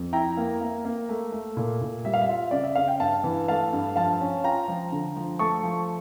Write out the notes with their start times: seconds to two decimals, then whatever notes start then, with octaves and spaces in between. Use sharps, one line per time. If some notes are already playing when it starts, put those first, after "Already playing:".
Already playing: F2
0.13 E4 G5 A#5
0.37 A#3
0.61 A#3
0.85 A#3
1.09 A3
1.32 A3
1.57 A#2
1.81 A#2
2.05 G3 E5
2.14 F5
2.22 E5
2.29 F4
2.51 C#3 D5
2.64 E5
2.75 C#3 F5
2.88 G5
3.00 G2 F5 A5
3.24 E3
3.48 A3 F5 A5
3.73 G2
3.96 F3 F5 A5
4.21 C#4
4.44 F4 G5 A#5
4.68 F3
4.92 D3
5.16 F3
5.39 A3 A5 C#6
5.64 F3